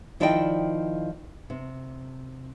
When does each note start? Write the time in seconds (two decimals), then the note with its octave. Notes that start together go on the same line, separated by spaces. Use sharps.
0.20 D#3 F3 E4 D5 D#5 G5
1.50 C3